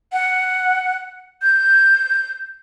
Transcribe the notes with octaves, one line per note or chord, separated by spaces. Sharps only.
F#5
G6